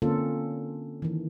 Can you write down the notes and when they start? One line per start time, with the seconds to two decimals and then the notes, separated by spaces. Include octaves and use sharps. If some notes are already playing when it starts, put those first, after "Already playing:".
0.02 D3 A#3 C4 C#4 F4 A4
1.02 D#3 E3